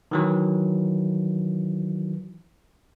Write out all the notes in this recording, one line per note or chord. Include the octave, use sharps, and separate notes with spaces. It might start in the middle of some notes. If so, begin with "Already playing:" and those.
D#3 E3 F#3